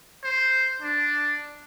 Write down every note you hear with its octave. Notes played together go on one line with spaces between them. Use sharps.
C5
D4